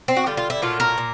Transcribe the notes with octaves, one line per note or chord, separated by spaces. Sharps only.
C4
F#4
D3 G3 F4
F4
E4
A#2 F#3 A3 F4
A#4
A#2